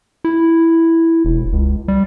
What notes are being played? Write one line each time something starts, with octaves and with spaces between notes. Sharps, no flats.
E4
E1
C#2
G3